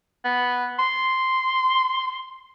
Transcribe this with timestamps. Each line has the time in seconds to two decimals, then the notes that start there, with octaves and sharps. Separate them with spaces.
0.25 B3
0.79 C6